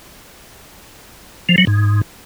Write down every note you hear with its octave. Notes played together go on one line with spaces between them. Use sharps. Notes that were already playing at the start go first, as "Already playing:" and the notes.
F3
F#3
G#2